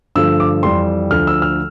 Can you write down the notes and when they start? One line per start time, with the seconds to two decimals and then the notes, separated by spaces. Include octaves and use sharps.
0.15 G2 D3 F3 A3 E6
0.40 D6
0.63 F2 E3 G3 C6
1.11 D2 D3 F3 A3 F6
1.27 E6
1.42 F6